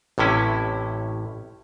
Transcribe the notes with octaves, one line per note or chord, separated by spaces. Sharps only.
A1 A2 C3 C#4 E4